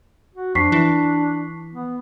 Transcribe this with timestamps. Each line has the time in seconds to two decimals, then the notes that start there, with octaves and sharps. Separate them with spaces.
0.36 F#4
0.55 F2 D4 C#6 B6 C7
0.72 E3
1.74 B3